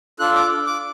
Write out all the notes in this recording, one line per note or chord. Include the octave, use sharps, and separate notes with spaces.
D4 F4 A4 F#6
D6
D6